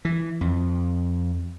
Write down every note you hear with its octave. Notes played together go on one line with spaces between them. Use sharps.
E3
F2